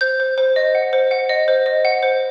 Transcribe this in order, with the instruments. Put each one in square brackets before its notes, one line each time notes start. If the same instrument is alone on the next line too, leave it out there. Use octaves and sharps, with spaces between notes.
[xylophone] C5 G6
C5
C5
D#5
F#5
C5
F#5
D#5
C5
D#5
F#5
C5